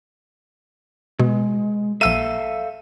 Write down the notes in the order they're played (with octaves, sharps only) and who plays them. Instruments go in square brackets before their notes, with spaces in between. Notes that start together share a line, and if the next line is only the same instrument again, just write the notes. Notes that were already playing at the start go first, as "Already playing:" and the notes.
[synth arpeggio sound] B2 [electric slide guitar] G#3
[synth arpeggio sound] A#1 E6 D#7 [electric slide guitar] A4 E5 F5